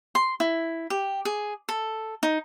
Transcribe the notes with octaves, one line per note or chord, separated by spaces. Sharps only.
C6
E4
G4
G#4
A4
D#4